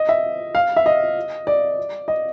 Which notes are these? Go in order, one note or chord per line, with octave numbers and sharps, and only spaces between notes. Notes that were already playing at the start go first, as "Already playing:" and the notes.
Already playing: D#5
E5
F5
E5
D#5
D5
D#5